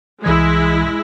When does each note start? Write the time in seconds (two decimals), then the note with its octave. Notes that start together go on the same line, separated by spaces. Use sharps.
0.24 C2 E3 G#3 E4 G#6